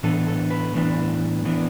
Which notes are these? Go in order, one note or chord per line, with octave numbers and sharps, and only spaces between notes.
A2 E3 B3 D4 A4
A4
B4
A2 E3 B3 D4
A2 E3 B3 D4